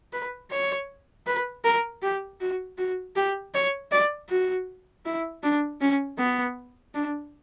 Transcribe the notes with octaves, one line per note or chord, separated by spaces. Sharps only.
B4
C#5
B4
A#4
G4
F#4
F#4
G4
C#5
D5
F#4
E4
D4
C#4
B3
D4